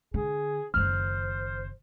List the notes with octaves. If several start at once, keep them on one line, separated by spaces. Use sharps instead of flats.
D3 G#4
F#1 D#3 C5 F6